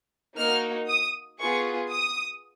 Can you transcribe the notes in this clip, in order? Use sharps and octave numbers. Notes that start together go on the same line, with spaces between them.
A#3 D#4 F#4 F6
D#6
B3 F4 G#4 C#6
D#6